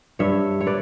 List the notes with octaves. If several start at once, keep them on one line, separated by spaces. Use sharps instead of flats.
G2 C#5 E5
C#5
B4 D5